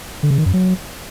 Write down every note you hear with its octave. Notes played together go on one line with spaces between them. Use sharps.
D3
C#3
D#3
F#2
F#3